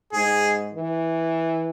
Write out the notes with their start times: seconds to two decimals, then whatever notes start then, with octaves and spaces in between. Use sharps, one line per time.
0.13 G#2 G#4
0.74 E3